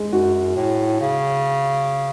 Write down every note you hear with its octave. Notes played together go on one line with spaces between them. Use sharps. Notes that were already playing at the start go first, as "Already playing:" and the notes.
Already playing: G#3
F#2 F#4
A2
C#3